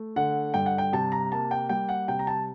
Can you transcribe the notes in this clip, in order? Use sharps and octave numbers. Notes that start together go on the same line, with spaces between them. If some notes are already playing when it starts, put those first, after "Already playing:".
Already playing: A3
D3 F#5
G2 G5
F#5
G5
C3 A5
A#5
A#3 A5
G5
G3 G5
F#5
C3 G5
A#5
A5